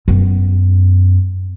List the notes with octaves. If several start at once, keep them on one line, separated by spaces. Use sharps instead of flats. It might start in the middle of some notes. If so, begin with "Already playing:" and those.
F#2 B3